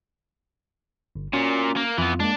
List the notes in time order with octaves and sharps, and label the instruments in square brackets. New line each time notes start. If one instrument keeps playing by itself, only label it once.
[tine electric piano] G1
[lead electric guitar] A#2 [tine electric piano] C#4 F#4
[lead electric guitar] A#3
[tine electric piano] F2 F4 [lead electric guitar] E3 B3
[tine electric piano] G#3 A#3 [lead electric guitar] D4